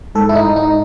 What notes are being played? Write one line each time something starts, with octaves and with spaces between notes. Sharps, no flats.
G#2 A4
E4
D#4
G#2
D#4